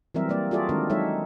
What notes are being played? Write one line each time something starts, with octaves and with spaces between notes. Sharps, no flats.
E3 F#3 G3 C4 A#4 E5
G3 A#3 D5
F4 F#4 G#4 A4 D5 E5
D#3 G#3 C4 D4 A#4
F#3 G#3 D#4 A4 C#5 E5